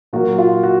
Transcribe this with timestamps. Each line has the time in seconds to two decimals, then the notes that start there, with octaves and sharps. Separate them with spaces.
0.13 A#2 F#3 A#3 F#4
0.38 F4
0.63 F#4